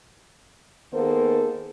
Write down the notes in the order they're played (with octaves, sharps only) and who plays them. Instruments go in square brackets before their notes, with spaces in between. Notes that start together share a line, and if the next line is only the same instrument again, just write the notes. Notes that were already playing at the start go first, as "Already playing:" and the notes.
[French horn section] D#3 A#3 B3 G#4 A4 C5